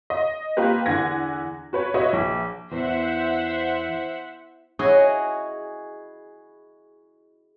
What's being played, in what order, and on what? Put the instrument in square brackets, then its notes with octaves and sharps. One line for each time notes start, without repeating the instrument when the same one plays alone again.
[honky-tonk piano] D#5
A#3 F4 G4 B4
E2 D3 F#5 G#5 G#6 A#6
F#4 B4 C#5
F#4 B4 C#5 D#5 E5
A#1
[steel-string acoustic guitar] E2 [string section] C5 E5 F#5
[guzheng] E4 F#4 G#4 C#5 D#5